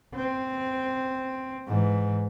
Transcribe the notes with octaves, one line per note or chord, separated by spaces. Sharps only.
C4
G#2 E3